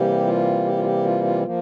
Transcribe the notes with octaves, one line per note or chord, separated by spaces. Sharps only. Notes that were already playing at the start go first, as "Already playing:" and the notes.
Already playing: C3 E3 G3 A#3 G4
F4
G4
F4
G4
F4
F4
F3 A#3 F4